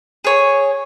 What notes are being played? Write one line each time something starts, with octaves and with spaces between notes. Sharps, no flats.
G#4 C#5